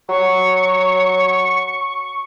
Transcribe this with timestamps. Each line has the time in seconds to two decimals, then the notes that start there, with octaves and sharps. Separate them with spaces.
0.09 F#3 C#6